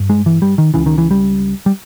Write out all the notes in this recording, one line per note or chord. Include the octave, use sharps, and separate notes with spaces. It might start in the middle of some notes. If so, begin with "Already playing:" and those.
Already playing: G2
G#3
E3
G3
D#3
C#2 C#3 E3
D#3
E3
G3
G3